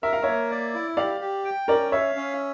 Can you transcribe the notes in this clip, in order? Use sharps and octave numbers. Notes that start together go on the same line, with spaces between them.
A#4 E5
F5
A#3 C#5 E5
D5
E4
G4 D5 F5
G4
G5
C#4 A#4 D5
C#5 E5 F5
C#4